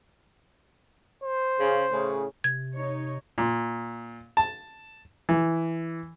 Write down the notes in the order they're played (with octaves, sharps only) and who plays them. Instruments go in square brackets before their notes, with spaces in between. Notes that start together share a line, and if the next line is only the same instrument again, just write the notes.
[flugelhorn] C5
[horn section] C#3
A2 C#3
[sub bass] C3 [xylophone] G#6
[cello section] D#4 C#5
[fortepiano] A#2
A5
E3